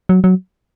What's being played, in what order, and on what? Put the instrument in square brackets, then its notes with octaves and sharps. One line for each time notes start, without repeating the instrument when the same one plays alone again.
[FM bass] F#3
F#3